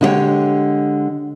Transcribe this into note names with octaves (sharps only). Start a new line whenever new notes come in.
D3 G#3 E4 G4 C#5 G5